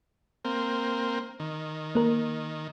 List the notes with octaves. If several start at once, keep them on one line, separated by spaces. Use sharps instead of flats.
A#3 C4
D#3
A#3 A#4